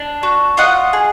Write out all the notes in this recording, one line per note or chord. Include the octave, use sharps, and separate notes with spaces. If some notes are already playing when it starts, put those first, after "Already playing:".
Already playing: D4
F#4
F4 D#5 F#5
G#4